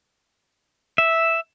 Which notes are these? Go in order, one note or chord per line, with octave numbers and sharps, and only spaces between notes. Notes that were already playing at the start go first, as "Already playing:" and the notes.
E5